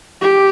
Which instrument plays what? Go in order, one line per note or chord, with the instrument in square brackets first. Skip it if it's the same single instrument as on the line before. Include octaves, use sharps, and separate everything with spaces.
[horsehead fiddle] G4